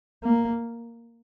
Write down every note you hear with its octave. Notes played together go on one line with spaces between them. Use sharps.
A#3